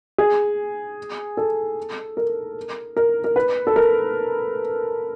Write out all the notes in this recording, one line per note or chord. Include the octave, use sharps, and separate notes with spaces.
G#4
A4
A#4
A#4
A#4
B4
A4
A#4